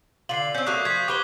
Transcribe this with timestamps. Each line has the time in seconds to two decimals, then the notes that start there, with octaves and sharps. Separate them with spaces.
0.29 D3 F4 C7 F#7
0.55 C4 C#4 G6
0.67 F#3 A3 A#3 C#6 D#6 F#6
0.85 F3 G#6 B6
1.08 G4 B4 C5 D6 G7